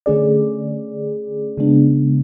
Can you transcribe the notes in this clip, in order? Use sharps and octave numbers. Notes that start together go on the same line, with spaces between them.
D3 A3 C#4 G#4 D5
C#3 G#3 B3 D4